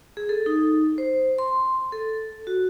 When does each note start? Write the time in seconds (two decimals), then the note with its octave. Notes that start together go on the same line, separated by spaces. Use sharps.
0.17 G#4
0.29 A4
0.46 D#4
0.98 C5
1.38 C6
1.92 A4
2.47 F#4